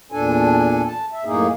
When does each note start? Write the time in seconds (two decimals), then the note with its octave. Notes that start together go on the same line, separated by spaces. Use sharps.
0.12 E2 A#2 D4 A4 G#5
0.87 A5
1.12 E5
1.25 F#2 A2 A#3 D#4 G#4